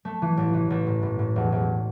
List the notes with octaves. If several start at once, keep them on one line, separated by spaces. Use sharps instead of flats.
A3
E3
A1
E3
A1
A2
A2
A2
E1
E1